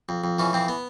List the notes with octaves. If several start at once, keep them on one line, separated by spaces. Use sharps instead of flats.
F2
F2
E3 C#4
F2 C4
B3